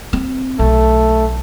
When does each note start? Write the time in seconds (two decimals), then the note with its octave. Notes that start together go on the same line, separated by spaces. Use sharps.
0.13 C4
0.59 B1 A3